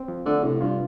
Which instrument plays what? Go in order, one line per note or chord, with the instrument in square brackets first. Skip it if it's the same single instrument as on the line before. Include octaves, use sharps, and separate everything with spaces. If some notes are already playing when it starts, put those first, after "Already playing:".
Already playing: [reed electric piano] C4
F3
[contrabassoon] D3 [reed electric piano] A3
[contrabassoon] A2 [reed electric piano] C3
[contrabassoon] G2 [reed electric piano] F4